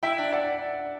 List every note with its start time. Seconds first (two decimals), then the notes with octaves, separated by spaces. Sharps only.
0.03 E4 E5 G5
0.18 D4
0.32 D5 F#5